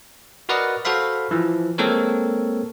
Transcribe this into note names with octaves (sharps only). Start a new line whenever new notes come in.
F#4 A#4 B4 D5 D#5 F#5
F#4 A4 C5 F5 B5
E3 F3
G#3 A#3 C4 A4 A#4 C#5